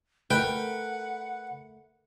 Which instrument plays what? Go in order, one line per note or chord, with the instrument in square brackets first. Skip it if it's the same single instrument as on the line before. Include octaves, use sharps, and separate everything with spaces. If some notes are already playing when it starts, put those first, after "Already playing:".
[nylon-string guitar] A3 A#4 [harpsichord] B4 [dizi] F#5 [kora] G5